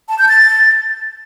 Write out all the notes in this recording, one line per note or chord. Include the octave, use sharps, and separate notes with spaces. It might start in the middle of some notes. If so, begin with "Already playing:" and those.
A5
G6
A6